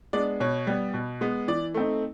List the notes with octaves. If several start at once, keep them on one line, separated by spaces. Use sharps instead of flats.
G#3 B3 D4 D5
B2 C#5
G3 B3
B2
G#3 B3
E3 D5
A3 C4 D#4